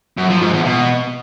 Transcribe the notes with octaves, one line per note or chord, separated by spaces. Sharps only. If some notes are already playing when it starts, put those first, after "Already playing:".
F#2
F3
G#2
E2
B2